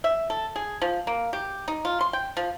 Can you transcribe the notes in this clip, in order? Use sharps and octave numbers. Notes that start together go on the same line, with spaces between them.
E5
A4
G#4
F3
A#3
G4
D#4
F4
C6
G5
F3